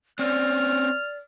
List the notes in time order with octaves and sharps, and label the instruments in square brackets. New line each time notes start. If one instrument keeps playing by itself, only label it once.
[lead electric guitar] C4 C#4 [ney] D5 [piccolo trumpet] F6